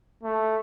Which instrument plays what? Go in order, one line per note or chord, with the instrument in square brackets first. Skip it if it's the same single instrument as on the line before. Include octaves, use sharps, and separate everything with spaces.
[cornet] A3